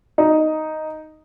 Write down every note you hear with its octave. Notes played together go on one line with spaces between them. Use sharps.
D#4